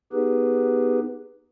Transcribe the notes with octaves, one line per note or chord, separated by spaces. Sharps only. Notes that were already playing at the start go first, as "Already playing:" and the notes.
B3 D#4 G4 G#4 B4